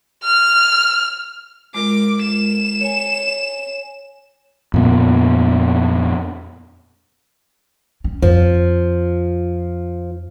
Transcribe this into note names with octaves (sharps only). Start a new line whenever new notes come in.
F6
G#3 F4 A#4 D6
E7
C#5 G#5
F2 A#2 B3
C#4
F2 F3